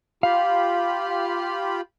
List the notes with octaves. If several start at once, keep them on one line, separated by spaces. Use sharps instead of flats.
F4 G4 F5 B5